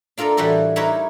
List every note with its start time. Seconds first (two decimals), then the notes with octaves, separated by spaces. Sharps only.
0.18 D4 F4 A4 A#4 D5
0.37 A2 E3 G3 F#4 A4
0.76 D#4 E4 G4 A#4 B4 C#5